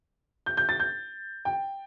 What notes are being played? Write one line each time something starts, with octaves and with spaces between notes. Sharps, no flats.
G6
G6
A6
G6
G5